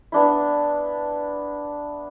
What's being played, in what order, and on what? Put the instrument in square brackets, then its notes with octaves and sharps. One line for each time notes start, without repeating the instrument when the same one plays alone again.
[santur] B3 D4 E4